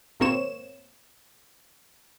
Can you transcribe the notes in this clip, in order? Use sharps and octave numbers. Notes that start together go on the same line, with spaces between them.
G#1 B2 A#3 C4 C#5 E7